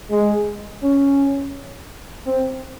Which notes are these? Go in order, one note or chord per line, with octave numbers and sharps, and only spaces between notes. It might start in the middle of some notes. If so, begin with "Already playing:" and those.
G#3
C#4
C4